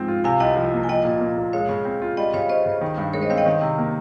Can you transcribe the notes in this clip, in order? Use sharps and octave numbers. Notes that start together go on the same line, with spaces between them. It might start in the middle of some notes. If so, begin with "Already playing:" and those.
Already playing: G#2 F3 C4
F4
C3 F5 G#5
C2 D#5 G5
F3
A#3
G#5
F3 D#5 G5
A#2
A#3
A#2
G#3 C#5 F5
C#3
C4
F4
G3 D#5 G5
C#3 C#5 F5
C#4 C5 D#5
C#3
D#3
G2
G#3 A#4 C#5
C5 D#5
C4 C#5 F5
D#5 G5
D#3
C3
A#3